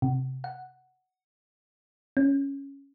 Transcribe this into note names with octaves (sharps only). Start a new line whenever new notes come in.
C3
F#5
C#4